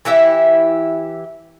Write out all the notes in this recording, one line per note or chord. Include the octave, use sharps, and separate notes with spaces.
E3 E4 G4 E5